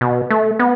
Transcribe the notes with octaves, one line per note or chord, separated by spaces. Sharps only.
B2
A3
B3